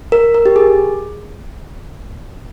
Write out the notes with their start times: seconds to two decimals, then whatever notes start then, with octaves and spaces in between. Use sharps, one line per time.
0.12 A#4
0.34 A#4
0.46 G4
0.56 G#4